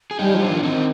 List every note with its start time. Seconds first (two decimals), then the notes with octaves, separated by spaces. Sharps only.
0.11 G#4
0.19 G3 D#4 G4
0.34 F3
0.41 D4 F4
0.49 D#3
0.63 D#3 C4 D#4